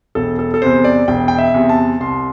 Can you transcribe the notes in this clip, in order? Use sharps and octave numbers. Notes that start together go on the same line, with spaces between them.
E1 A4
A4
A4
E2 C3 C5
D5
E1 G5
G5
E5
E2 C3
A5
C2 C6